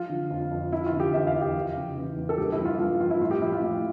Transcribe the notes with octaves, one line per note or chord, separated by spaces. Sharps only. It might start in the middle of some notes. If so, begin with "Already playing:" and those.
Already playing: F3 F4
D3
F2
F2
F3 E4
F4
D3
G4
E2 E5
F5
E2
G4
F3
C#3
E2
E2
A4
G2 G4
E4
F3
F4
G2 F4
F3 F4
E4
A2 F4
G4
F3 E4
F4
A2